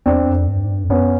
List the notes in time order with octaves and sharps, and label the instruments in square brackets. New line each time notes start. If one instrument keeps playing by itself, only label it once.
[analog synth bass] E2 [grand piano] C4 D4
[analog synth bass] F2
G2
G#2
G2
F2
[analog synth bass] F#2 [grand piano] B3 C#4